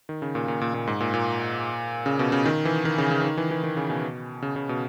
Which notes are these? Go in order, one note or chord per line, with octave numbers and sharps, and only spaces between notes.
D#3
C#3
A#2
A#2
A#2
A#2
G#2
A#2
A#2
C#3
B2
C#3
D#3
E3
D#3
C#3
C#3
D#3
E3
E3
D#3
C#3
B2
C#3
C#3
B2